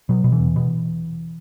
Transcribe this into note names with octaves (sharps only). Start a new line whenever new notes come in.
B2 F#3
B2
E3
E2
B2